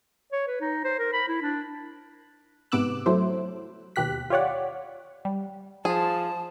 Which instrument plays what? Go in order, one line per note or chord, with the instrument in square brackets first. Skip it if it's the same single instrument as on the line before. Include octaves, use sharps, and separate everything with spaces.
[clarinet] C#5
B4
D#4
C5
A#4
B5
E4
D4
[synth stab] G#2 C3 B3 D6 E6 F#6
F#3 A3 E4 C5
D#2 B2 G4 F#6 B6
F4 G4 C#5 D5 F#5
G3
[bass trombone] F3 [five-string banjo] G#4 [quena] A5